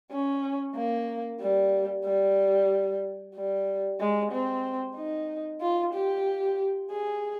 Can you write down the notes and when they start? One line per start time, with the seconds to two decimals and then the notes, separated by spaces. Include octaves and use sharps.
0.11 C#4
0.76 A#3
1.40 G3
2.05 G3
3.34 G3
4.00 G#3
4.31 C4
4.95 D#4
5.61 F4
5.93 G4
6.90 G#4